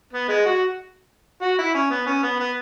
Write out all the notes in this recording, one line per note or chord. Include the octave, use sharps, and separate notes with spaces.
B3
G#3
F#4
F#4
E4
C#4
B3
C#4
B3
B3